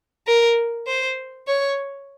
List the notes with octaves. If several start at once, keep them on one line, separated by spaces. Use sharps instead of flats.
A#4
C5
C#5